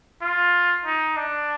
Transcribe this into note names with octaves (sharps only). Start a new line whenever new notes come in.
F4
D#4
D4